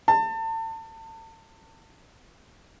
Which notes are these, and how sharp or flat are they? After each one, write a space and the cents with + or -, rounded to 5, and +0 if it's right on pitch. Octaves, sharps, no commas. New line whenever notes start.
A5 +35